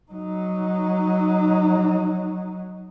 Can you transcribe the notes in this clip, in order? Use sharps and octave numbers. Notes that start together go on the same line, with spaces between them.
F#3 D#4